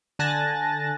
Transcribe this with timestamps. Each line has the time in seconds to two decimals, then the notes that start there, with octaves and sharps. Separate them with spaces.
0.19 D3 G#5 A5 F#6 A6 A#6